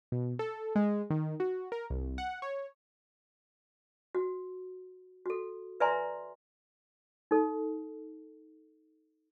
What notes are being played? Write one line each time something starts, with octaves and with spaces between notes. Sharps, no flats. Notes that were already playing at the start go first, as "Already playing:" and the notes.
B2
A4
G#3
D#3
F#4
A#4
C2
F#5
C#5
F#4
F#4 A4
B4 D5 E5 G#5 A#5 C6
D#4 A4